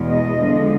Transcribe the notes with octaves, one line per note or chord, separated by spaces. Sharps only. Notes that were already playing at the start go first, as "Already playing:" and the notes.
Already playing: E2 B2 G#3 B3
D#5
D3 F3 G#3